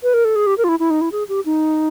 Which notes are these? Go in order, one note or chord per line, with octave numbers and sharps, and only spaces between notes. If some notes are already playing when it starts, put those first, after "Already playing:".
B4
A#4
A4
G#4
G4
A#4
F4
E4
E4
D#4
E4
G#4
G4
D#4